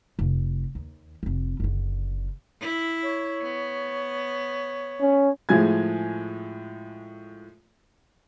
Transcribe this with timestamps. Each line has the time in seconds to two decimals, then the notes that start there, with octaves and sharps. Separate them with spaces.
0.19 F1
0.75 D#2
1.23 F1 C4
1.60 F#1 D3
2.61 E4
3.03 C#5
3.43 B3
5.01 C#4
5.49 A2 F3 G#3 G#5 G#6